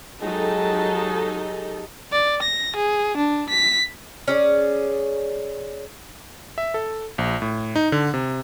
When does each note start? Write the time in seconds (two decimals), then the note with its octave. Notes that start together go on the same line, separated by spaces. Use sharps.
0.21 F#3 G#3 D#4 G4 A4 A5
2.12 D5
2.43 A#6
2.76 G#4
3.17 D4
3.49 B6
4.28 C#4 G#4 D5
6.58 E5
6.74 A4
7.18 A#1
7.42 A2
7.76 D#4
7.92 D3
8.14 C3